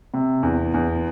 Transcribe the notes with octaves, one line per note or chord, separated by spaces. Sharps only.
C3
E2
E2